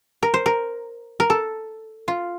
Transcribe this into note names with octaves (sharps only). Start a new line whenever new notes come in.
A#4
C5
A#4
A#4
A4
F4